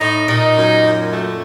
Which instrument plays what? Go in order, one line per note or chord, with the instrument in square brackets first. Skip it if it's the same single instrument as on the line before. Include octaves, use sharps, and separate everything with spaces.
[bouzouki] A2 [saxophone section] D#4
[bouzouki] A#2 [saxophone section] D#4
[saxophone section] F#2
F#2
A3